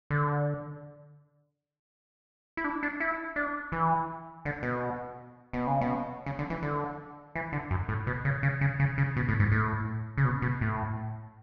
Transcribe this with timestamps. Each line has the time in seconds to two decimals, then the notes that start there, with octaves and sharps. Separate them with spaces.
0.10 D3
2.57 E4
2.64 D4
2.83 D4
3.00 E4
3.36 D4
3.72 E3
4.45 D3
4.63 B2
5.53 B2
5.67 C#3
5.81 B2
6.26 C#3
6.39 D3
6.50 E3
6.62 D3
7.35 E3
7.53 D3
7.71 F#2
7.89 A2
8.07 B2
8.25 C#3
8.43 C#3
8.61 C#3
8.80 C#3
8.98 C#3
9.17 B2
9.29 A2
9.40 G#2
9.52 A2
10.18 C#3
10.25 B2
10.42 B2
10.61 A2